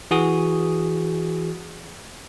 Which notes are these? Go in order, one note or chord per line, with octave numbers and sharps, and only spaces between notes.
E3 F#4 G#4 D#6